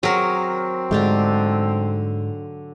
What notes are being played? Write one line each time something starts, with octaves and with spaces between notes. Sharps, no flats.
F#3 C4 G#4 A#4
G#2 D3 G#3 A3 D4 G4